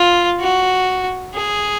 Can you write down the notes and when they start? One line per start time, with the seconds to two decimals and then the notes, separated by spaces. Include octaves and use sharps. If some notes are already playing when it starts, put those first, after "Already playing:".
Already playing: F4
0.40 F#4
1.34 G#4